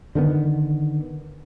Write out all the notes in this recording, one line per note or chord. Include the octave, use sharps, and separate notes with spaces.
D3 D#3 G3 B3